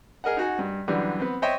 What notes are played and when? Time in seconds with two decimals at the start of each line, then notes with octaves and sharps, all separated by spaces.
0.24 G#4 A#4 D#5 F#5
0.37 D#4 F#4 G#5
0.59 G2
0.88 F#2 D3 E3 G3
1.20 B3 C4
1.42 C5 C#5 D#5 E5 G5 C#6